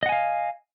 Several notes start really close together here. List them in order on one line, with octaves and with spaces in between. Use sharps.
D#5 F#5 G#5 F5